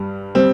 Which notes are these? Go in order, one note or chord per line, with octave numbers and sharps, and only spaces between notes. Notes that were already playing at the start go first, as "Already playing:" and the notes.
Already playing: G2 G3
G3 C4